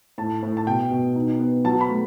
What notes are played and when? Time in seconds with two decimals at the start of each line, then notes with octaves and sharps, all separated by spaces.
0.18 A2 A5
0.43 A2
0.57 A5
0.66 B2 G5
0.91 B2
1.16 D#4
1.40 B3
1.64 F#3 A5
1.81 B5
1.89 A3